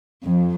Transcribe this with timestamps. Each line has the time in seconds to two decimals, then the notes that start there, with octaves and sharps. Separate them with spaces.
0.24 F2